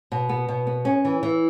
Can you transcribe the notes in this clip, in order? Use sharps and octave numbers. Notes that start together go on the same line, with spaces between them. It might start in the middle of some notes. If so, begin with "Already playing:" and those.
B2
B3
B2
B3
C#4
E3
E3